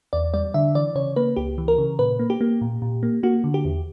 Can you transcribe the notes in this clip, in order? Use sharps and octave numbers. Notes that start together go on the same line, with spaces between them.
E2 D5
G3 D5
D3 E5
E3 D5
C#3 C#5
A#3 B4
C#2 G4
E3
A#4
C#3
A#2 B4
A#3
G4
A#3
A#2
A#2
A#3
A#3 F#4
D3
G4
E2